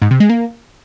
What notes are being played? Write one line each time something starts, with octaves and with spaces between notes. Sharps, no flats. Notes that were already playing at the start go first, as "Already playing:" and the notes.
G#2
C3
G#3
A#3